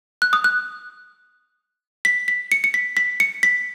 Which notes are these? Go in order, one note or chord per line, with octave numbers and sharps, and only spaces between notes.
F#6
D#6
F#6
B6
B6
C#7
C#7
B6
B6
C#7
B6